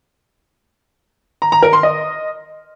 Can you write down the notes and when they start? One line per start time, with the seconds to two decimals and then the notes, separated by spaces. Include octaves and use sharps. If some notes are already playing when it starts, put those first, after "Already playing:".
1.42 A#5
1.52 A#5
1.63 A#4
1.73 C6
1.83 D#5